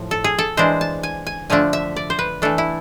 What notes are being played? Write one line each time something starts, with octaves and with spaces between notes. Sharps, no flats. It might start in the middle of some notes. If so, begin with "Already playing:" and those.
Already playing: A2 F3
A4
G#4
A4
E3 G#3 D4 C5
A5
G#5
G#5
D3 F3 A3 D4 G#5
E5
D5
C5
B4
E3 A3 D4 A4
E4